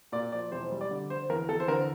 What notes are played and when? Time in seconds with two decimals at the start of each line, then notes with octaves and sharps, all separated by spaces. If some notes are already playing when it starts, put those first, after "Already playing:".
0.12 A#2 D5
0.32 F3 D5
0.52 E1 C5
0.71 G3
0.81 D5
0.91 D3
1.10 D3 C5
1.29 E2 A#4
1.49 E2 A4
1.60 C5
1.68 D3 A#4